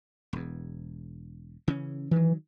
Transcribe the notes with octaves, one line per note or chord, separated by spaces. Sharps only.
E1 E2
C#3 E3 C#4
D#3 E3 F#3